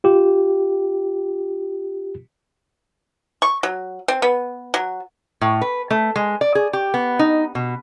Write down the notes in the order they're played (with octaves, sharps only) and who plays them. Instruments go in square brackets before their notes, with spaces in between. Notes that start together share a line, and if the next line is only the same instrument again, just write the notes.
[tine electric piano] F4 G4
[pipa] C#6
F#3
C4
B3
F#3
[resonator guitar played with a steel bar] A2
B4
A3
G#3
D5
G#4
G4
B3
D#4
B2